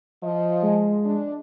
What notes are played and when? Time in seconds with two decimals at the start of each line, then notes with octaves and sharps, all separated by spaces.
0.24 F3 D#5
0.63 G#3
1.05 D4